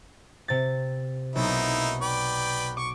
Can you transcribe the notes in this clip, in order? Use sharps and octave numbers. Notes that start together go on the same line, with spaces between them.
C3 A6
B1 A#3 D#4 E4
B4 D5 G5
C#6 D6